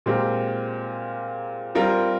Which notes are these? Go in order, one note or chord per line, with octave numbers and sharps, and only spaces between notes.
A#2 G#3 C4 G4 A#4
G3 C4 F4 A#4